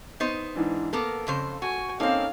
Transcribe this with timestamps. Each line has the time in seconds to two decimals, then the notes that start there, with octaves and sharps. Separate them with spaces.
0.20 B3 D#4 C5
0.56 G#2 E3 D4
0.93 A#3 B3 A4 A#4
1.27 F2 C#3 C5
1.62 F#4 G#5
2.00 A#3 C4 C#4 D#4 A4 F5